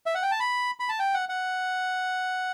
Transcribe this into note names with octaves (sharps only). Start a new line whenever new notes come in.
E5
F#5
G5
A5
B5
B5
A5
G5
F#5
F#5